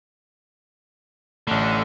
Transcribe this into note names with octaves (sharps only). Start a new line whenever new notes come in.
A1 D3 A3